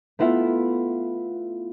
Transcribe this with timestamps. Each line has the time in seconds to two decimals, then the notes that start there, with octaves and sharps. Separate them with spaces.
0.19 A3 B3 E4 F4 E5